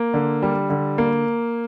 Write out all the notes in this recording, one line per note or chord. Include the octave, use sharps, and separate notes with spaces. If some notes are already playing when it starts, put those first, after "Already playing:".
Already playing: A#3
D3
G3
D3
A#3